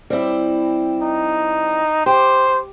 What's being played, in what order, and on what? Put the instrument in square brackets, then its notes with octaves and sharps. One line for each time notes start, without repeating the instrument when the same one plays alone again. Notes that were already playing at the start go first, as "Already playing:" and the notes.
[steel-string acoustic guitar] G3 C4 E4
[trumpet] D#4
[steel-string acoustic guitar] G4 [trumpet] C5